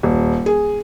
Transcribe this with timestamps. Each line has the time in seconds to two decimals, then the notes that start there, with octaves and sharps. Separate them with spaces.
0.03 D#1
0.46 G#4